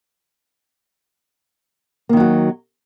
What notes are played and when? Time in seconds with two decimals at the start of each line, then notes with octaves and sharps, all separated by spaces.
2.09 A#3
2.13 D#3
2.17 F#3
2.20 F#4